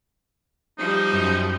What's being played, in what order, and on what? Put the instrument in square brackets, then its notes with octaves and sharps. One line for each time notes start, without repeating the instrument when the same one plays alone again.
[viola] F3 G3 [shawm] D#4
[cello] F#2